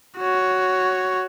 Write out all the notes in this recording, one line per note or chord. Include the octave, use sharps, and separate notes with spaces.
F#4 C#5